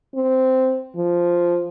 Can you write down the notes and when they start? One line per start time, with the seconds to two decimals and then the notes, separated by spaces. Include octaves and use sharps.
0.15 C4
0.96 F3